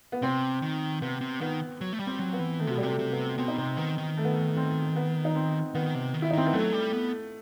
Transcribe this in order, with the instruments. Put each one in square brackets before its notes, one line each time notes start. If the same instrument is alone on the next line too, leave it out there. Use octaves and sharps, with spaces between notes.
[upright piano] B3
[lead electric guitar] C3 [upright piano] C4
[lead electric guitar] D#3
[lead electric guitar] C3 [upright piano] B3
[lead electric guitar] C3
[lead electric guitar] D#3 [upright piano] B3
[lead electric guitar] F#3
A3
G3
[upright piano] C4
[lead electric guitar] F#3
[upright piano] B3
[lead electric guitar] E3
[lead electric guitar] D#3 [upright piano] A3
[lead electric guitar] C3 [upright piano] F#3
[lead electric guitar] B2 [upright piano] G3
[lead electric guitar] C3 [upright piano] A3
[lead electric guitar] C3
[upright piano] B3
[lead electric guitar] B2 [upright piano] C4
[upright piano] D#4
[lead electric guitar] C3 [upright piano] C4
[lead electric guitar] D#3 [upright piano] B3
[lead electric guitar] D#3
[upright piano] A3
B3
A3
C4
B3
D#4
C4
[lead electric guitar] D#3 [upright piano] B3
[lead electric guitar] C3
D#3
[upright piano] E4
D#4
[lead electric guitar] D#3 [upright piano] C4
[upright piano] B3
[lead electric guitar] F#3 [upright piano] A3
[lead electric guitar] G3
B3